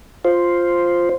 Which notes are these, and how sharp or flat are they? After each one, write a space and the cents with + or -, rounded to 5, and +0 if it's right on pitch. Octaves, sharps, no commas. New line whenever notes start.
F4 +0 C5 +0